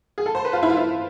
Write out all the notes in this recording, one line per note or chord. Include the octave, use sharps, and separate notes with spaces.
G#4
A4
C5
B4
F4
E4
F4
E4